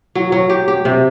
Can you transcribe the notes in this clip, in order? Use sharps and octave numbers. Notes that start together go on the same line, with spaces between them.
F#3
F#3
G4
G4
C3